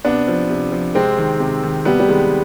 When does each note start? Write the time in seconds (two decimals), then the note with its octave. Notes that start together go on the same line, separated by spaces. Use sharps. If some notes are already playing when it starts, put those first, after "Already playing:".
0.05 C3 B3 D4
0.28 F3
0.50 C3
0.72 F3
0.95 C3 G#3 C4
1.18 D#3
1.40 C3
1.63 D#3
1.85 C3 G3 B3
2.00 G3
2.08 D#3 G#3